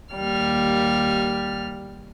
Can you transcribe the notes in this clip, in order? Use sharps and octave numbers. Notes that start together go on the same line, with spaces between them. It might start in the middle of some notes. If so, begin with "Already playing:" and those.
D#2 G3 F6